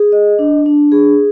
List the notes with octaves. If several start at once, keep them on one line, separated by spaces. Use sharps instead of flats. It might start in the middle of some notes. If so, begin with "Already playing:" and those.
Already playing: G#4
D#5
D4
D4
G#4